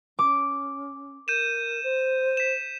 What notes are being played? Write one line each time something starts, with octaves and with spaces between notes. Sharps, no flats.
C#4 D6
A#4 G6 D#7 E7
C5
B6 E7